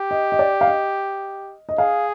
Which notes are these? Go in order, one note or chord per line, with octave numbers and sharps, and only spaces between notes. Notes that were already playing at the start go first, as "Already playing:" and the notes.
Already playing: G4
D#5
D#5
D5
F5
D#5
D#5
G#4 F5